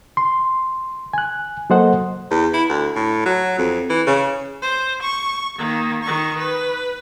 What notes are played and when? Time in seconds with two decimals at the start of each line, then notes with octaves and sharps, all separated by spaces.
0.17 C6
1.13 G#5 F#6
1.70 F#3 A#3 A4 C5 D#5 F#5
2.30 E2
2.53 E4
2.70 D2
2.96 A2
3.26 F#3
3.58 F2
3.90 E3
4.07 C#3
4.62 C5
5.02 C#6
5.58 D#3 A#3
6.03 D#3 C#6
6.38 B4